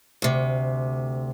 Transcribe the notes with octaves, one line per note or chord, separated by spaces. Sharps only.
D2 C3